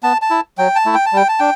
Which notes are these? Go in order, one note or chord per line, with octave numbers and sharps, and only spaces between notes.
B3 A5
A5
E4
F#3 G5
A5
A3 E4
G5
A5
G3 G5
A5
D4 G5